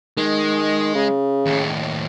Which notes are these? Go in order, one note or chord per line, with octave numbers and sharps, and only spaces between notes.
D#3 G#3
C#3
D#2 A2